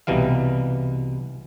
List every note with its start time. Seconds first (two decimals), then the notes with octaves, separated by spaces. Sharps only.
0.07 C2 B2 E3 G3 F5